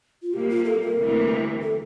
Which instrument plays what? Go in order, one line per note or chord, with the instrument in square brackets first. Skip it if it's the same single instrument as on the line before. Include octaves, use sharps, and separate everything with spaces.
[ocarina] F4
[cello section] C3 G3 A#3 [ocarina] G4
[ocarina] F4
A4
A#4
[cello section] D2 C3 E3 G3 A#3
[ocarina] A4